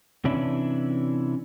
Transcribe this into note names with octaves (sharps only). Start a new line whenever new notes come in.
C3 E3 C#4 D4 E4